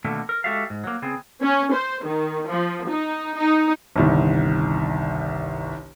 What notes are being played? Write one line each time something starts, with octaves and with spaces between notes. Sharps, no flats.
B2 D3 D#3 A3 A#3
A#4
G#3 F#4 G4 A4 E5 F5
G#2
F#3 A#3
C#3 B3 C4 G#4
C#4
C5
D#3
F3
D#4
D#4
G1 C2 D#3